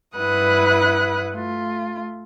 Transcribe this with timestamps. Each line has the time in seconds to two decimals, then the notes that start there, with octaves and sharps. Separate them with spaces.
0.17 G2 E4 B4 F#5 D#6 F#6
1.32 A3 F4